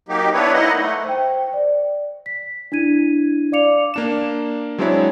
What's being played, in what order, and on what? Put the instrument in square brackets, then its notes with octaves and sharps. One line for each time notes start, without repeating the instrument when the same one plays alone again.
[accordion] F#3 A#3 D#4 G4
B3 D4 E4 B4 C#5
A#3 D#4 E4 D#5 F#5
A3
[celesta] C5 G5
D5
B6
D4 E4 G#6 D#7
D5 F5 D6 C#7 F7
[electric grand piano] A#3 D4 E7
F#3 G#3 C4 D4 E4 C#5